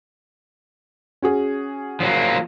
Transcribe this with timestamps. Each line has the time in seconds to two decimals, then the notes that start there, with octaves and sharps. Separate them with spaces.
1.22 C#4 F#4 G#4
2.00 F3 F#3 A#3